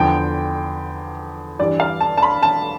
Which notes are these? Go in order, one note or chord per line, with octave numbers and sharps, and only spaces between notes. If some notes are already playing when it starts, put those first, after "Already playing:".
Already playing: E2 D3 F3 G5
G2 E3 G3 D5
F5
A5
A5
B5
A5